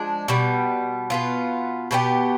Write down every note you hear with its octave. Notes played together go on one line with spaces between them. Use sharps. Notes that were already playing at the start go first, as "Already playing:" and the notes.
Already playing: F3 G#3 D4
B2 G3 B3
B2 B3 F4
B2 B3 D#4 G4